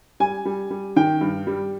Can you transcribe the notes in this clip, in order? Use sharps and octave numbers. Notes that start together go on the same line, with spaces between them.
G3 G#5
G3
G3
D#3 G5
G2
G3